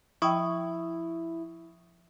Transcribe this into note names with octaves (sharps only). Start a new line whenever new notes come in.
F3 E4 G5 C#6 D#6